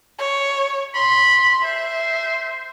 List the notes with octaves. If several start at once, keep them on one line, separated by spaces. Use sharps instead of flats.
C#5
B5 C6
C5 E5